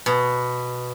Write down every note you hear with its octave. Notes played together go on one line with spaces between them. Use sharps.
B2